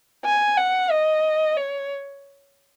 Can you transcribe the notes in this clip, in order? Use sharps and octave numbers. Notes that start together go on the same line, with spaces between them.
G#5
F#5
D#5
C#5